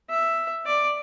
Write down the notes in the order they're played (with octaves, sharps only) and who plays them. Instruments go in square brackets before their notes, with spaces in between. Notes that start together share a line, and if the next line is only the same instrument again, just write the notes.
[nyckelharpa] E5
D5